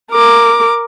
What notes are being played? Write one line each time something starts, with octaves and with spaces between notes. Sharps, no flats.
A#4 D6